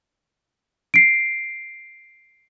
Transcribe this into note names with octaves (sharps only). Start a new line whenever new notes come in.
C7 D7